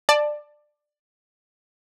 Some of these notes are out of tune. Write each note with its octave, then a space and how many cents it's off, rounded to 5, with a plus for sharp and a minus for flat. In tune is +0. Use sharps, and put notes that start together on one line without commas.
D5 +15 A5 +0